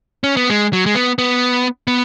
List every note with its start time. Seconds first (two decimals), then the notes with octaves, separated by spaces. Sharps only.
0.24 C#4
0.37 B3
0.50 G#3
0.73 F#3
0.86 G#3
0.95 B3
1.18 B3
1.87 B3